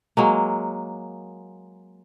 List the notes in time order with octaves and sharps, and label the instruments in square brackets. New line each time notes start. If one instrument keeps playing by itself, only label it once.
[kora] F#3 G#3 A#3